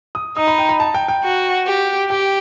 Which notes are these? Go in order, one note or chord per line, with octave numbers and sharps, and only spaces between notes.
D#6
D#4 D#6
B5
G5
B5
A5
G5
G5
F#4
G4
G4 G5